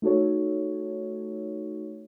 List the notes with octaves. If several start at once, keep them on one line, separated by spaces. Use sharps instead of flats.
A3 D#4 F#4 A4 C#5